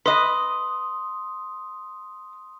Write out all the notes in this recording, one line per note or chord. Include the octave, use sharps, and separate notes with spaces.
B4 D#5 C6 D#6